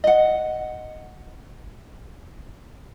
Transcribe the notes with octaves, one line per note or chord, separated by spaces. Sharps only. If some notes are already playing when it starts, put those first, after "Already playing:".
D#5 F#5